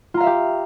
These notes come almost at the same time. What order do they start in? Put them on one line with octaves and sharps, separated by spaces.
F4 A#5 F5 E5 G4